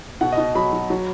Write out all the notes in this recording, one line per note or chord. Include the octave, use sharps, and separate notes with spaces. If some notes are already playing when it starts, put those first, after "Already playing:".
B2 F#5
D#5
B2
F#3 B5
F#3
F#3